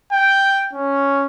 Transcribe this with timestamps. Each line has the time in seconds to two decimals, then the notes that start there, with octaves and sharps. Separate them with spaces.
0.12 G5
0.73 C#4